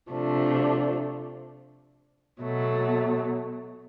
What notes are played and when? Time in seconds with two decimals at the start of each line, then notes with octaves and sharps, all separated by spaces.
0.12 C3 F3 A3 D4
2.41 B2 F#3 A3